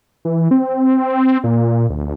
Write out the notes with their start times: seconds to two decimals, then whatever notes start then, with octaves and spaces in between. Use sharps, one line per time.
0.25 E3
0.51 C4
1.44 A#2
1.89 D2